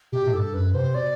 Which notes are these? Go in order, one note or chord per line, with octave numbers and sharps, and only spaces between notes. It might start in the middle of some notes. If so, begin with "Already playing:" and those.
B2 G4
A2
G2 A4
F#2 B4
C3 C5
B2 D5